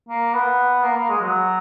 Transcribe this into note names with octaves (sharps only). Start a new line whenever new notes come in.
A#3
B3
A#3
A#3
G#3
F#3